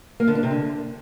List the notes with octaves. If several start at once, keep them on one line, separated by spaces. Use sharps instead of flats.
A#3
D3
D4
C3
D3